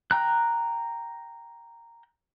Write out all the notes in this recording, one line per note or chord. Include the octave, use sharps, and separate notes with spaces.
G5 A#5 F#6